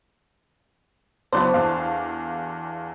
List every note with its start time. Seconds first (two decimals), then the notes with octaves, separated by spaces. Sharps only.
1.33 C#2 F#3 B3 D4 E4 F#4 C5
1.54 E2 A4 F5 C6